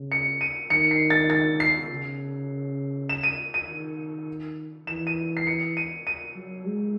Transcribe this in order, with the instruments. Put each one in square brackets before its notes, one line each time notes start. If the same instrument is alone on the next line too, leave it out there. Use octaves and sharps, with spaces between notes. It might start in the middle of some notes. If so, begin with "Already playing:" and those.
Already playing: [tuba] C#3
[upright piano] C#7
D#7
[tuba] D#3 [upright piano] C#7
[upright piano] C7
A6
A6
C7
[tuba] C#3
[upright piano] E7
D#7
D#7
[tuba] D#3
[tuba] E3 [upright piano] E7
[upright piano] D#7
C7
C#7
D#7
D#7
[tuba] F#3
G#3